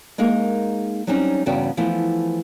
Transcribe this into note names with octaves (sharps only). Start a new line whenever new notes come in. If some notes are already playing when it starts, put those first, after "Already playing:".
G#3 A#3 D#4 G#4 A#4
F#3 G3 C4 C#4 D#4
E2 G2 C#3 B3 F#4 G5
E3 F3 A3 B3 E4